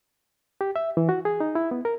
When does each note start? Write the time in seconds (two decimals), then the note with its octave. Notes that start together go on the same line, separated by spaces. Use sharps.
0.61 G4
0.76 E5
0.97 E3
1.09 F#4
1.25 G#4
1.40 D#4
1.55 E4
1.71 B3
1.85 A#4